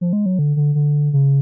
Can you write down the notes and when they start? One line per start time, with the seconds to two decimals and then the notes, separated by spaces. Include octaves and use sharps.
0.01 F3
0.13 G#3
0.26 F#3
0.39 D3
0.56 D3
0.75 D3
1.13 C#3